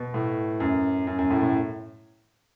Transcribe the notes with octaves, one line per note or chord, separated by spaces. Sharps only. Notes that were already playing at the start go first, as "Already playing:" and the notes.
Already playing: B2
A2
F#2
F#2
F#2
A2
A2